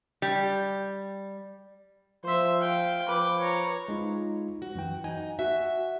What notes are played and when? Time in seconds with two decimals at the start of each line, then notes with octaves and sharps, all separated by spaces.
0.22 G3
2.24 F3 C5 E5
2.60 F5 G5
3.09 F3 B4 G5 D6
3.39 C#5 A#5
3.88 G#3 D#4 F4
4.62 F#4
4.75 F#2 E3 G5
5.04 D#4 G#5
5.39 F#4 E5